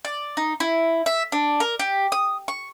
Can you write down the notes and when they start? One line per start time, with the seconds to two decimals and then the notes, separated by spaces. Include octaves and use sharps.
0.05 D5
0.37 D#4
0.60 E4
1.06 E5
1.32 D4
1.60 A#4
1.79 G4
2.12 D#6
2.48 C#6